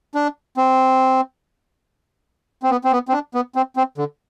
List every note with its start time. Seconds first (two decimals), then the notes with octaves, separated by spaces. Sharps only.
0.15 D4
0.57 C4
2.63 C4
2.70 B3
2.84 C4
2.92 B3
3.08 C4
3.13 D4
3.34 B3
3.55 C4
3.76 C4
3.98 D3